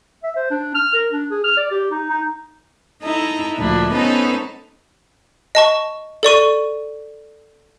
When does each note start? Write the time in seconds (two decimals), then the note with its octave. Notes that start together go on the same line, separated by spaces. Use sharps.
0.24 E5
0.36 C5
0.51 D4
0.75 F6
0.94 A#4
1.12 D4
1.31 G#4
1.44 F6
1.57 D5
1.71 G4
1.91 D#4
2.10 D#4
3.02 D#4 E4 A4 A#5
3.56 D2 A#2 F3 D4 E4
3.93 B3 C#4 D#4 A4 B4 C5
5.55 D#5 A5 C#6
6.23 A4 D5 C#6 D#7